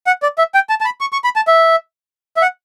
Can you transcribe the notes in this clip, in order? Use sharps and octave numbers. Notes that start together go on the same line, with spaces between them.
F#5
D5
E5
G5
A5
A5
B5
C#6
C#6
B5
A5
E5
E5
F#5